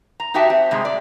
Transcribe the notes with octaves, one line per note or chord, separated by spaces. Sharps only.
A#5
D#4 F#4 G4 E5 G5 A5
C4
G#2 C3 G3 G#3
D5